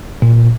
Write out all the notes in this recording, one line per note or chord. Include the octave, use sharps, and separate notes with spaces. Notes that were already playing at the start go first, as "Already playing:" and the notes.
A#2